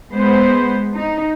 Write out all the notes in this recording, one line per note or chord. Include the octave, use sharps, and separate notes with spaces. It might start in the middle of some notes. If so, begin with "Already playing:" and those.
G#3 B3 C5
D#4